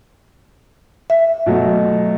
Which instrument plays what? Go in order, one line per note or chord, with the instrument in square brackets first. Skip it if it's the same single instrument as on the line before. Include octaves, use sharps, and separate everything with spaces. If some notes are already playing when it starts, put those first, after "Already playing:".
[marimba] E5
[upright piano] B2 F#3 A3